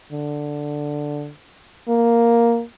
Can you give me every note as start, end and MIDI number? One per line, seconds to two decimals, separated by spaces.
0.13 1.30 50
1.89 2.62 58